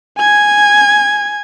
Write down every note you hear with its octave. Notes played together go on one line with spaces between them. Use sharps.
G#5 G#6